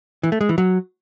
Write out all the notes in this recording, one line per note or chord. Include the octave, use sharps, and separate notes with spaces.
E3
A3
G#3
E3
F#3